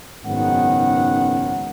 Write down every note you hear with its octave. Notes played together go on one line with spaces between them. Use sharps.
F#1 G#2 D#3 B3 C#4 F#5